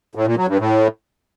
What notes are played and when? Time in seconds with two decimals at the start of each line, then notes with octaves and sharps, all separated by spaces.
0.15 A2
0.26 A#2
0.37 F#3
0.48 G2
0.59 A2